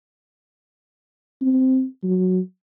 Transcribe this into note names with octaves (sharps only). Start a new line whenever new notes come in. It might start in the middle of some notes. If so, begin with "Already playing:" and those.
C4
F#3